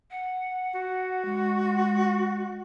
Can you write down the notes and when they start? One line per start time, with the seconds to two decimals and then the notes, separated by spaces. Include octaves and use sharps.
0.11 F#5
0.75 F#4
1.25 G#3